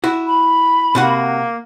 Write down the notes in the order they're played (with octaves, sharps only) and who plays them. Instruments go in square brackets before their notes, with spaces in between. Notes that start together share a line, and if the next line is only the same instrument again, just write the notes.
[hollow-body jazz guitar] E4 F#4
[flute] B5
[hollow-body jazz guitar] C3 F#4 F#5 [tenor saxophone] A#3